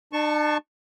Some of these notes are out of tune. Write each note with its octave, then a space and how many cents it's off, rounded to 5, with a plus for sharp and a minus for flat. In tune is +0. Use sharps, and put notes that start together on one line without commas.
D4 +45 A5 +0 C#6 -5